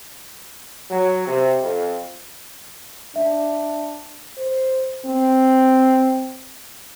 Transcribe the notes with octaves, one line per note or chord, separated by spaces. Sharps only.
F#3
C3
F2
D4 E5
C5
C4